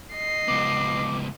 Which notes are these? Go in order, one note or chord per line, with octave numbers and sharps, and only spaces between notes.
D#5 C7
C#2 B3 D6